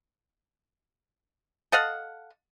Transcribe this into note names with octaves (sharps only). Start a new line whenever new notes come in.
A4 D#5 F5 F#5